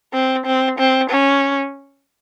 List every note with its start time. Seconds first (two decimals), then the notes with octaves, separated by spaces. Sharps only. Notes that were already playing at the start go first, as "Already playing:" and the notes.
0.14 C4
0.46 C4
0.79 C4
1.10 C#4